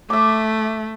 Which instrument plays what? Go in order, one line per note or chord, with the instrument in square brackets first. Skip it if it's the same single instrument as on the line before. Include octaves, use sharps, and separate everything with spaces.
[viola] A3 [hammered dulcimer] E5 D6